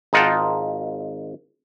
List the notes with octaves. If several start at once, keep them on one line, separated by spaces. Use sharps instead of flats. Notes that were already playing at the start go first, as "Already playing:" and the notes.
G#1 D#4 F4 F#5 G5 A5